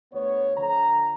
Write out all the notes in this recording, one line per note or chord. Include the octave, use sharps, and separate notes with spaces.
D2 B3 C5 C#5
D3 F3 A4 A#5